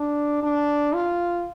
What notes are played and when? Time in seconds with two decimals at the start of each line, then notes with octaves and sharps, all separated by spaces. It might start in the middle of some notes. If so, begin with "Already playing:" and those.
Already playing: D4
0.43 D4
0.94 F4